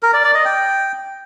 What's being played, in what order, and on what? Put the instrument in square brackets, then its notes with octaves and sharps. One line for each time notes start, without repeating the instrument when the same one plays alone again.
[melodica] A#4
D5
D5
D#5
G5